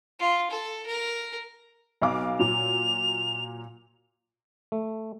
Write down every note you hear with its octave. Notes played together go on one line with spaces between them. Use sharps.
F4
A4
A#4
B1 F5 D6
A#2 F#3 F7
A3